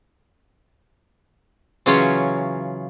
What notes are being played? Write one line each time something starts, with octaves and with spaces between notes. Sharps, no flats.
C#3 E3 F#3 C#4 F4 C#5